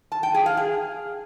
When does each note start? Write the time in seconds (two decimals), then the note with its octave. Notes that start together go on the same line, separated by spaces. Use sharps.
0.12 A5
0.23 G5
0.34 G#4
0.46 F5
0.57 G#4